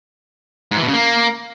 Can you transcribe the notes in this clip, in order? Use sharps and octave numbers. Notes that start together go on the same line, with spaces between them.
G#2
E3
B2
C#3
A#3